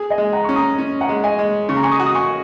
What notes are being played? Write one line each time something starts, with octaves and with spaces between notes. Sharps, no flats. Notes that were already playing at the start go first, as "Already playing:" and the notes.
Already playing: G#4
D#5 G#5
G#3
F#5 A#5
C#4 C#6
A#5 D#6
C#4
F#5 A#5
G#3
D#5 G#5
G#3
C#3 C#6
A#5
G#5 C#6
A#5 D#6
F#4
D#6
G#5 C#6